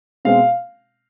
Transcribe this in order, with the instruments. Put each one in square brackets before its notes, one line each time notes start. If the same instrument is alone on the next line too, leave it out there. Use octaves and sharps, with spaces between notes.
[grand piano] B2 G#3 C4 F5